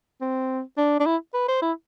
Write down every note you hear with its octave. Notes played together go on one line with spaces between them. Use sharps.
C4
D4
D4
E4
B4
C5
E4